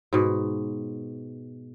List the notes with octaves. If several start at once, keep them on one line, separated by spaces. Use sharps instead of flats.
G#2 B2